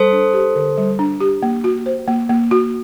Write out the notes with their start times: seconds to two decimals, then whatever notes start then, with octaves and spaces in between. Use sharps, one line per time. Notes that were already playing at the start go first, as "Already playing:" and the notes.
Already playing: G3 A4 C5
0.12 D4
0.33 G4
0.55 D3
0.77 G3
0.99 D4
1.20 G4
1.43 A#3
1.64 F#4
1.86 C5
2.08 A#3
2.29 A#3
2.51 F#4